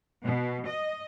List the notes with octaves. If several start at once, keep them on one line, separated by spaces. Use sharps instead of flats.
B2
D#5